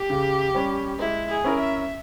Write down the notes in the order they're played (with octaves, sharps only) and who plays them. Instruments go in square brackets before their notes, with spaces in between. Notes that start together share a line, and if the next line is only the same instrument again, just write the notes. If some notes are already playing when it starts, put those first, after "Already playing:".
Already playing: [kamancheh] G4
[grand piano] C#3
G3 C#4
[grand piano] G#3 [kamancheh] E4
[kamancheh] G#4
[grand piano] C#4 E4 A#4
[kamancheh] E5